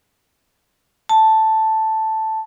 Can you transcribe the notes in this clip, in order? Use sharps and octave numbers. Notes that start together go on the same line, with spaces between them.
A5